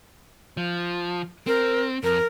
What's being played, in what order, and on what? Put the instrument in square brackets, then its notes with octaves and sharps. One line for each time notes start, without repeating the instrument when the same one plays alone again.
[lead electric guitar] F3
[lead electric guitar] C4 [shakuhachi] A#4
[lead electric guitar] F2 [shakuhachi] A#4